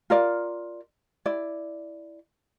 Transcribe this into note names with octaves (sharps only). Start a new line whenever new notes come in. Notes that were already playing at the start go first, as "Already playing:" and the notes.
F4 A#4 D5
E4 D5